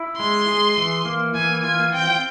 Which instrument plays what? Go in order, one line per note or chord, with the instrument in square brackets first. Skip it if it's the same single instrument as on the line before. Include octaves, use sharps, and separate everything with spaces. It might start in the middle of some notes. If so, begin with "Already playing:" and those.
Already playing: [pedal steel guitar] E4
[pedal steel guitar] G#3 [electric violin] C6
[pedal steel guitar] G#4
E3
A#3
[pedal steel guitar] E3 [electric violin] G#5
[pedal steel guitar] F4 [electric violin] G#5
[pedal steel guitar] C4 [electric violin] G5